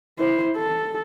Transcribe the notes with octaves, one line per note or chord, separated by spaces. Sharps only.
E4 C5
A4